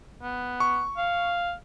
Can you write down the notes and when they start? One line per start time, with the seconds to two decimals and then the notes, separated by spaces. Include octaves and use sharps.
0.23 B3
0.60 C#6
0.97 F5